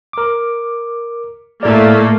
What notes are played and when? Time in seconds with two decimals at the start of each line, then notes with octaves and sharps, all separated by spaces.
0.13 A#4 D6
1.63 A2 A3 A#3 D5